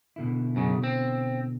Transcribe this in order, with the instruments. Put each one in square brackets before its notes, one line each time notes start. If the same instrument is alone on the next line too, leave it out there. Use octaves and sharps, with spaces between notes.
[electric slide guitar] B2 D3 E4
[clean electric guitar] F#2 C#3
C4